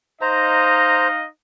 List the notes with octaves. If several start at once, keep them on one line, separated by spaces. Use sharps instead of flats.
D#4 C5 D#5 F5 A#5